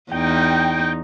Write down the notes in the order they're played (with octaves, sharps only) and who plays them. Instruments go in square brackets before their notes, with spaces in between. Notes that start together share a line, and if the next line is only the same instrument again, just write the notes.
[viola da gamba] E2 D#4 [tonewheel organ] G5